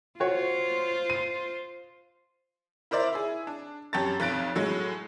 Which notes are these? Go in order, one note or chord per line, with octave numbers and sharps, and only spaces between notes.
F4 F#4 C5 C#5
D#7
E4 A#4 C5 D5 E5
E4 G#4
D4
F#2 G4 C#5 A5 A6
B1 F2 F#6 A6 D7
A2 F#3 G#3